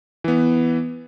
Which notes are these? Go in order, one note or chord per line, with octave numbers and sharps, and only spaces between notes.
E3 B3